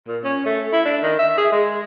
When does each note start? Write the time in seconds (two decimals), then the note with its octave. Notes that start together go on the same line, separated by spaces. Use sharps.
0.07 A#2
0.24 C#4
0.46 A3
0.73 E4
0.85 D4
1.03 D#3
1.19 E5
1.37 G#4
1.52 G#3